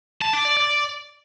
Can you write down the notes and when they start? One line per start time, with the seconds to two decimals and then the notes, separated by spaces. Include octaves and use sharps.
0.21 A5
0.33 D5
0.45 D5
0.57 D5